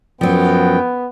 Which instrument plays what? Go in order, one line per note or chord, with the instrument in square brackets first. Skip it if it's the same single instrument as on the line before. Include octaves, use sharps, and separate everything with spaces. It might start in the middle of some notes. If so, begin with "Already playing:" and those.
[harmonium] F#2 G5 [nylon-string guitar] F3 F#3 [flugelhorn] B3